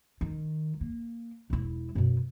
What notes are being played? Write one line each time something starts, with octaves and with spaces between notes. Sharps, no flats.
D#3
A#3
E1 E4
F#2 B2